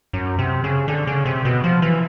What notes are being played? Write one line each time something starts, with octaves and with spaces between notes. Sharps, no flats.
F#2
C3
C#3
D3
C#3
C3
B2
F3
E3